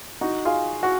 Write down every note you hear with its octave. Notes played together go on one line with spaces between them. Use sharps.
D#4 F#4
F4 G#4
F#4